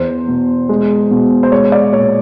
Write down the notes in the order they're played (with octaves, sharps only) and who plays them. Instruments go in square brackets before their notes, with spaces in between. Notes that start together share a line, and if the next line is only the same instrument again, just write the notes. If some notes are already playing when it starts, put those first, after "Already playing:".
Already playing: [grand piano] E2 C5
B2
G#3
B2
C5
G#3 C#5
D5
A#2 C#5